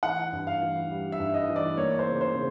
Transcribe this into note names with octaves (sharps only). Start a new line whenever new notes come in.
E3 F#5
G2
F5
E3
G3
E5
G2
D#5
E3
D5
A#3 C#5
C5
C#3
C5
C#3